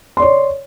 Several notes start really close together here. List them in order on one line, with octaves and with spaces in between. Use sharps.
C6 D5 C#5